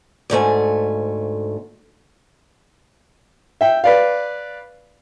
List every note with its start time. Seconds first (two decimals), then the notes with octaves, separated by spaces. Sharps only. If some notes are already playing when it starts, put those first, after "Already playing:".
0.30 D2 G#2 A3 G#5
3.61 E5 G5
3.84 B4 D5 F5